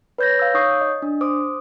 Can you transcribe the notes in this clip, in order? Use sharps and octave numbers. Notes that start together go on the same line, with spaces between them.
B4 C#5 G6 G#6 A#6
F5 E6
D#4 C#5 C#6 D#6 G6 C7
D#5
D4
C5 D6 D#6